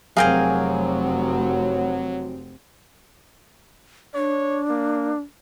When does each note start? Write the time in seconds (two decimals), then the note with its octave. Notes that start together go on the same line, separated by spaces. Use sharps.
0.17 F1 F#3 C4 G#4 A#4 F5 G5 G#5
4.15 D4 C#5
4.70 A#3